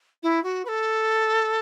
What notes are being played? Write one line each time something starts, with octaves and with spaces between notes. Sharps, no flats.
E4
F#4
B4
A4